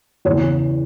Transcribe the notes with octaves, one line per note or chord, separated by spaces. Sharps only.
E2 C#3 E3 C#5